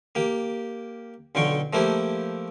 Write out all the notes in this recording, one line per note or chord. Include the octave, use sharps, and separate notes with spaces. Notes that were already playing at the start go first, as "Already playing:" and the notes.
A#3 G4
B1 D3 F4 G5 C#6
F3 A3 A#3 E4 G4 C5